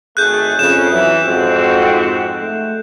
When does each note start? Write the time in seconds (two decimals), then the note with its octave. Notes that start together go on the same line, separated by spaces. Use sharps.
0.17 G#1 A3 G#4 F#6 G6
0.59 F2 C#3 E7
0.91 E3 F#3
1.24 F2 G#2 C4 F#4
2.42 A3